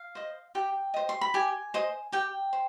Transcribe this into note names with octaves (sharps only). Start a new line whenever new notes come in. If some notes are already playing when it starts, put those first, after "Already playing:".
Already playing: F5
C5 D#5
G4 G5
C5 D#5
C6
B5
G4 G#5
C5 D#5
G4 G5
C5